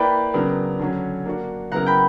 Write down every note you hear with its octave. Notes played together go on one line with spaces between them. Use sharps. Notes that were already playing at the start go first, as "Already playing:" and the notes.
Already playing: A#3 E4 B4 D5 G5 B5
C#3 F#3 B3 D4 A#4
D3 F#3 C#4
A#3 D4 F#4
C#3 F#3 B3 E4 A#4 F#5 A#5
G5 B5